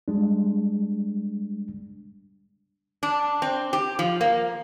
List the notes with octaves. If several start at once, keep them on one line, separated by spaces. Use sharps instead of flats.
G3 G#3 D4
D4
C4
G4
F3
A#3